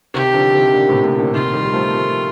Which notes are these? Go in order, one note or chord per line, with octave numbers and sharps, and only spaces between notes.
C3 D#3 G4
D3 F3
C3 D#3
A#2 D3
A2 C3
A2 C3
A#2 D3
C3 D#3 F4
D#3 G3
G3
F3 A3
F3 A3